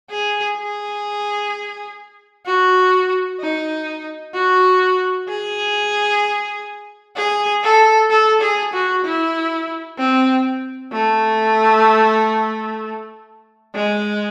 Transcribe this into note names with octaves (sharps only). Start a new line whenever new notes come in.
G#4
G#4
F#4
D#4
F#4
G#4
G#4
A4
A4
G#4
F#4
E4
C4
A3
G#3